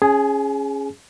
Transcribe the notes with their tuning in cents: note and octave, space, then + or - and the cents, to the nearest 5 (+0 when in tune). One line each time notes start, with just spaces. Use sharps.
C#4 -5 G#4 +0 G#5 +40